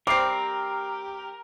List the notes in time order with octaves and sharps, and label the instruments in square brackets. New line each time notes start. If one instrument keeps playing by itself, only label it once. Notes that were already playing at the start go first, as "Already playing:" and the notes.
[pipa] G3 C4 [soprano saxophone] G4 [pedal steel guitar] A#4 [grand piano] D6 C7